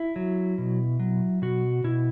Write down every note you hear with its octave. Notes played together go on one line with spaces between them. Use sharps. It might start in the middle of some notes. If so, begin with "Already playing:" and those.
Already playing: E4
F#3
B2
F#3
B2 F#4
B2 E4